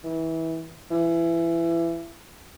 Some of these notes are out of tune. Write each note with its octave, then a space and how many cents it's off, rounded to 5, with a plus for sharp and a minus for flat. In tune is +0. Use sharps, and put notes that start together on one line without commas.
E3 -25
E3 +25